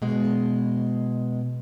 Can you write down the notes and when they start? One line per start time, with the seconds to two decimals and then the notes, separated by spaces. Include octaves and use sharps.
0.02 B2 G#3